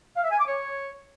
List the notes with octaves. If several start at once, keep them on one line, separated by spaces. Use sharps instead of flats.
F5
E5
G#5
D6
C#5